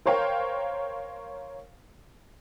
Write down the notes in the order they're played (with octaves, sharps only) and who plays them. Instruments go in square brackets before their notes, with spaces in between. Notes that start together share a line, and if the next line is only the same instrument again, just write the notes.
[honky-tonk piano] A#4 C5 C#5 F5 G5